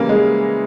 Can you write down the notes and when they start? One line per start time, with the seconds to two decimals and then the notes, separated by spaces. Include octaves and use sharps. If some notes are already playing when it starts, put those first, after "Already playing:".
Already playing: C#3 E3 G3 A#3 C#4
0.09 G#3